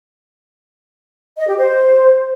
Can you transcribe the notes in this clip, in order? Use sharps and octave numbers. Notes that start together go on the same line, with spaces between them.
D#5
G4
C5